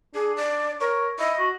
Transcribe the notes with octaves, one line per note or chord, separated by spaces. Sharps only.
D4 G#4
D5
A#4 C#5
E4 D#5
F#4